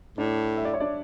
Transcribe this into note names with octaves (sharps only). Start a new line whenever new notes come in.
A2 D4 D5
E5
D5
C#5
D4 D5